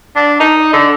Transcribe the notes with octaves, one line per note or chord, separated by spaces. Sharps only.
D4
D#4
D3